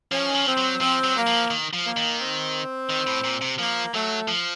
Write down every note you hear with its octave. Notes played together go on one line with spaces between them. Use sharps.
F3 C#4
D#3
F3
C4
F#3
F3 C4
F#3
A#3
F3
D#3
F3
A#3
D#3
C4
D#3
A2
A#2
C3
F3 A#3
F#3 A3
F3